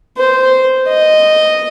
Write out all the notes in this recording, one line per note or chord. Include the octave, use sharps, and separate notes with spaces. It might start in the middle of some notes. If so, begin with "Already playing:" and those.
C5
D#5